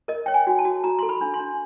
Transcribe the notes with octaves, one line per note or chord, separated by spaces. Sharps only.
A#4 D#5
C#5 G5
G#5
F#4
A5
F#4
F#4 A#5
A4 C6
B5
D4
C6
D4